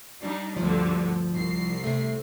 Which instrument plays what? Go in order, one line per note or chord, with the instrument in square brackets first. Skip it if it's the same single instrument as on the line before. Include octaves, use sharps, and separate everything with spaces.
[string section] G3 D4 D#4
[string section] D2 G2 D3 [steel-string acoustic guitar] F3
[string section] C2 C7
[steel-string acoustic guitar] C3 A3